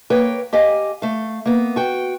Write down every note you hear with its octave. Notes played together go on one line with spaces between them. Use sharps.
A#3 B4 C#5 G5
G4 D#5 F5 G#5
A3 F5
A#3 B3
F#4 G5